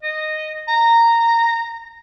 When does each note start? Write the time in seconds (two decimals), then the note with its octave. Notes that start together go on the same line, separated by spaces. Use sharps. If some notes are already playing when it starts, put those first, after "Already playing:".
0.03 D#5
0.68 A#5